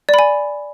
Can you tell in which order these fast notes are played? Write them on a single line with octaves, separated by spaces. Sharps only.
D5 B5 G#5